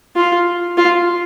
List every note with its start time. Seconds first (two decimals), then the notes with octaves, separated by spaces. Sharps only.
0.16 F4
0.78 F4